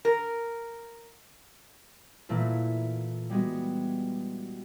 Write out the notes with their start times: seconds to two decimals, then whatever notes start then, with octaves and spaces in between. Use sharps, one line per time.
0.05 A#4
2.29 A#2 E3 A3 A#3 E4
3.30 G3 G#3 B3 F#4